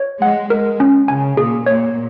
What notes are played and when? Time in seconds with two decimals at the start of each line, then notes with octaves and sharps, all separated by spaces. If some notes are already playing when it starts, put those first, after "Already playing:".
Already playing: C#5
0.21 G#3 F#5
0.50 G#3 A#4
0.80 C#4
1.08 C#3 G#5
1.37 A#2 G#4
1.66 A#2 C#5